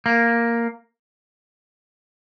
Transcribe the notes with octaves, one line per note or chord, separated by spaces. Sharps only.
A#3